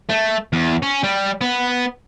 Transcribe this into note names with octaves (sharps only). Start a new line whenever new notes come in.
A3
E2
C#4
G3
B3